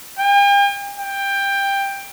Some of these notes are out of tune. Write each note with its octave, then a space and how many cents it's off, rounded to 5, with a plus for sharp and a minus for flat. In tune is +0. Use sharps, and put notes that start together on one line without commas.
G5 +45
G5 +15